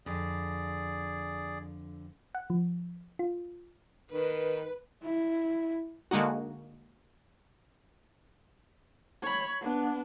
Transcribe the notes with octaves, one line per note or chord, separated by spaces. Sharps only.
F2 D3 G#4 D5
F#5
F3
F4
D#3 B4
E4
D3 G#3 A#3 D#4 F#4
C#5 B5
B3 D4